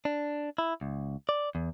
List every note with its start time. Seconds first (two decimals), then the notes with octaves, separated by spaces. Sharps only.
0.05 D4
0.58 E4
0.81 C#2
1.29 D5
1.55 E2